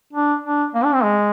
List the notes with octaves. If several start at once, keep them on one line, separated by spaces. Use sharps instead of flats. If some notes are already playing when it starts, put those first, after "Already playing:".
D4
D4
A#3
D4
C4
G#3